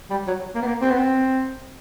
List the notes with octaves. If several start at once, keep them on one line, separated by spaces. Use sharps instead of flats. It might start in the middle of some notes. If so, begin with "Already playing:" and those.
G3
F#3
A#3
B3
A#3
C4
B3
C4